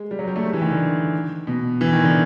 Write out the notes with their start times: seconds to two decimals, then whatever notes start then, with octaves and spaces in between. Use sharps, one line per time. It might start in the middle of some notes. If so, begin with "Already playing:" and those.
Already playing: G#3
0.11 G3
0.19 F#3
0.28 G3
0.36 A3
0.45 G#3
0.53 E3
0.61 D#3
0.70 D3
1.47 B2
1.81 E3
1.93 D#3
2.03 D3